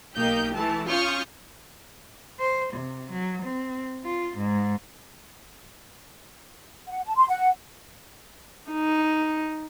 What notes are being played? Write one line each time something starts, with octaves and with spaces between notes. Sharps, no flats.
B1 A#3 D#4 G4 G6
E3 A3 A5
C#4 F4 C#6 D#6 F6 G6
C5
C3
F#3
C4
F4
G#2
F#5
A5
C6
F#5
D#4